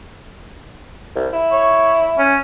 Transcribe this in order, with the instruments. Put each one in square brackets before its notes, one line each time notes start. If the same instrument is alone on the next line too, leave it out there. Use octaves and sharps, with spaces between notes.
[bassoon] C2
E4
[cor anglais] C#5
C#4